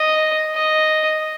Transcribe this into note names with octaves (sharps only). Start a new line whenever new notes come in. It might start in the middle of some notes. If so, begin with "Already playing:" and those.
Already playing: D#5
D#5